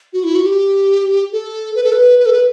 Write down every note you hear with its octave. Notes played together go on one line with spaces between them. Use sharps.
F#4
E4
F#4
G4
A4
B4
A4
B4
B4
A4
B4